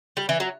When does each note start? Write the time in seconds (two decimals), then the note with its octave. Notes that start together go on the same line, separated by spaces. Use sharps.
0.17 G3
0.29 E3
0.40 F#3